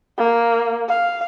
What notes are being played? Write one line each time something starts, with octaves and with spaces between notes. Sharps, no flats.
A#3
F5